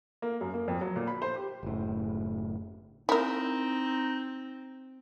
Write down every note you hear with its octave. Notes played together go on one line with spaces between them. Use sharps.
A#3
F#2
A#3
F2
F#3
A#2
B5
C5
G4
F#1 A2
C4 D#4 E4 A#4